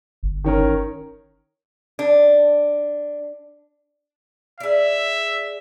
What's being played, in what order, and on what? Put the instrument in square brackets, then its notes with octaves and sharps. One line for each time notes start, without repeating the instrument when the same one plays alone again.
[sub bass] G1
[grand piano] D#3 C#4 A#4
[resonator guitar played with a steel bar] D4
[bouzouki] G#4 D5 [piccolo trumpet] E5